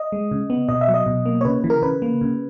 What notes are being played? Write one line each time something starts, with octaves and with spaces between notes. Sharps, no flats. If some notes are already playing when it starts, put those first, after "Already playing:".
Already playing: D#5
G#3
C#3
B3
B2 D#5
E5
F#3
D#5
B2
A#3
C#5
C#3 B4
E3
A#4
C#3 B4
A#3
C#3